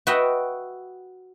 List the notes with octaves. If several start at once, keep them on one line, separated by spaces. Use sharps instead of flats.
F#4 B4 D#5 E5 F#5 G5